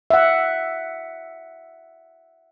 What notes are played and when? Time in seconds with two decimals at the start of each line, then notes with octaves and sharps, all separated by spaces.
0.10 E5 F#5